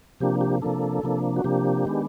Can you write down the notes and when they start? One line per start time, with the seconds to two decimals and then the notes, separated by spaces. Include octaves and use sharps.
0.20 C3 F3 A#3 D4 G4
0.41 G4
0.62 C3 F3 A#3 D4 A4
1.03 C3 F3 A#3 D4
1.36 F#4
1.44 C3 F3 A#3 D4 G4
1.85 D#3 G#3 B3 D4